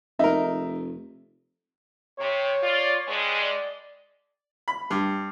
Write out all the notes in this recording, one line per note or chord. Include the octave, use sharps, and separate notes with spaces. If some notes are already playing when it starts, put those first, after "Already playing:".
F1 D#4 A#4 E5
C3 C#5
F4 D5
G2 G#3
D5
B5
G2